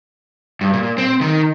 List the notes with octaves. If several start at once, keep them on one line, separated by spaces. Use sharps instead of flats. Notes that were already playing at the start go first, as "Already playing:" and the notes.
G2
A#2
C4
D#3